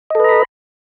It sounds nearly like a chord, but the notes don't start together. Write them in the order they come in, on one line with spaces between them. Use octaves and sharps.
D#5 A4 B4 A#5 B5